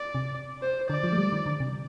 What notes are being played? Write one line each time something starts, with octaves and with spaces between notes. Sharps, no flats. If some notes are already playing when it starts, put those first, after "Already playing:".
Already playing: D5
C3
C5
D3 D5
F3
A3
G3
D#3
D3
C3